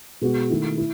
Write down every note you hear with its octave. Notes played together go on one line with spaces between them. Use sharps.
B2 G#3 B3 F#4
D#3 A3 E4
E4